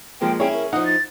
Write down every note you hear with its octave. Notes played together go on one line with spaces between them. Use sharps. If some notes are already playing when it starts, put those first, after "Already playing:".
F3 G#3 A#3 G5
C#4 E4 G#4 C#5 G5
A#4
F3 D#4 F#5 D#6
A6